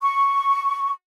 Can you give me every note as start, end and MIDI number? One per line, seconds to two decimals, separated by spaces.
0.02 0.91 85